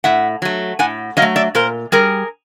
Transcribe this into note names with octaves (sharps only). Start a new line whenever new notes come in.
A2 E5 F#5
F#3 A3
A2 F#5 G#5
F#3 D#5 F5
A3
D5 E5
A#2 A#4 C5
G3 G#4 A#4